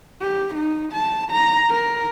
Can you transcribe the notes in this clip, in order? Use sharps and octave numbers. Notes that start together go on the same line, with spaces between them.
G4
D#4
A5
A#5
A#4